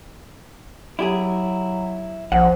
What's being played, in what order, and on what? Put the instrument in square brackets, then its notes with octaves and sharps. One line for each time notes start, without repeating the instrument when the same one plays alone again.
[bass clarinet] F#3 [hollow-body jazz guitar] E4 G4 G#4
[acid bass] A#1 [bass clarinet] F3 [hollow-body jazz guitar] F#5